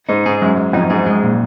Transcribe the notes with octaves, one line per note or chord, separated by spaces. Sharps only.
G#2 D#4
G#2 G#4
F#2 G#3
G#3
F2 D#4
F#2
G#2 G#4
G#3
A#2